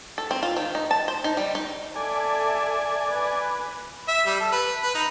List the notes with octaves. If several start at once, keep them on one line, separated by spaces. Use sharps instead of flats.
A4
C4
F4
D#3
D#4
A5
C5
D#4
G3
D#4
A4 D5 E5 G#5
B4
E5
G3
A4
B4
B4
D#4